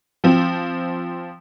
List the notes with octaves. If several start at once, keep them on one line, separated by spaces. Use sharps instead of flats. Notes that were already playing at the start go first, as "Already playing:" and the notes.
F3 C4